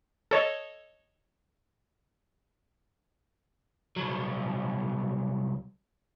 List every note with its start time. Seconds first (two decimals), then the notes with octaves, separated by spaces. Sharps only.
0.31 A4 C#5 D#5
3.96 C2 F#3